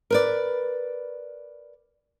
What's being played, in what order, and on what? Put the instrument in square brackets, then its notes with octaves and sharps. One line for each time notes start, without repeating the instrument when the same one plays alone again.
[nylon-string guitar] A#4 B4 D5